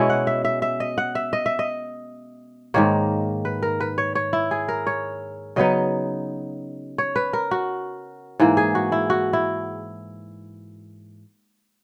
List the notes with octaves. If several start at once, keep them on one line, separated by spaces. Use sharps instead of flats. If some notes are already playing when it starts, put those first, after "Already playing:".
Already playing: B2 G#3 C#4 E4 D#5
F#5
E5
E5
E5
D#5
F#5
E5
D#5
E5
D#5
G#2 D#3 A#3 C#5
B4
A#4
B4
C#5
C#5
E4
G#4
A#4
C#5
C#3 F#3 B3 D#4 D#5
C#5
B4
A#4
F#4
G#2 E3 A#3
G#4
F#4
E4
F#4
E4